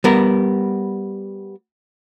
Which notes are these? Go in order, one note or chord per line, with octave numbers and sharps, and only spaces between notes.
G3 B3 A#4